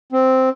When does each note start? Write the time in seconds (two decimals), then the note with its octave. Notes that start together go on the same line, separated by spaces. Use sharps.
0.12 C4